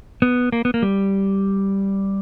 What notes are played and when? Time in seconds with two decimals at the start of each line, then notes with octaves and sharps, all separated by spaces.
0.22 B3
0.52 A#3
0.65 B3
0.74 A#3
0.82 G3